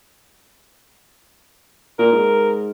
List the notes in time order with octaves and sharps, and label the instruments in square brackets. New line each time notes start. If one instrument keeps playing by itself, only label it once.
[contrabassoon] A#2 [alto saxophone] A#4
[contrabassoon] G#2